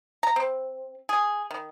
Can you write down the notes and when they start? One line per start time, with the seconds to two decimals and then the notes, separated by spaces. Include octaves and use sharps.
0.23 A#5
0.36 C4
1.09 G#4
1.51 D#3